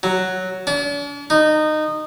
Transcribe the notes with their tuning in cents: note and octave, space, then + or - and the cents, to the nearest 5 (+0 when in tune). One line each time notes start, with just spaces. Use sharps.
F#3 +5
D4 -45
D#4 -20